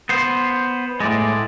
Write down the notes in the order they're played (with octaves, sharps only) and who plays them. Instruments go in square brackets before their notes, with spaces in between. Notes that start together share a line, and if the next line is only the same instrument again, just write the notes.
[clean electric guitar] B3 C5
[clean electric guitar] A2 G#3 [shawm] D5